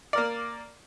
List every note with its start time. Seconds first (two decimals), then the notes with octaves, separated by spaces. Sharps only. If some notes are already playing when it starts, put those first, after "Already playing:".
0.13 A#3 A#4 D5